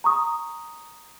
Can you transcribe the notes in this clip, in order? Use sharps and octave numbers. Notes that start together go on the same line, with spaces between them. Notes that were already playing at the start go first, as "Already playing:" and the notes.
A#5 C#6 D#6